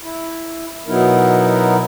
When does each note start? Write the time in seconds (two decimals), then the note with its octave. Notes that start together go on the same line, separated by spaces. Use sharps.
0.01 E4
0.87 B2 F#3 B3 D#4 E4 A#4